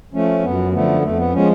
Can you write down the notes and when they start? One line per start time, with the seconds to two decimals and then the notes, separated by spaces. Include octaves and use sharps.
0.14 F3 A3 C#4
0.43 F#2 B3
0.72 D3 F3 A3 B3
1.02 F2 A3
1.18 B3
1.33 F3 G#3 C#4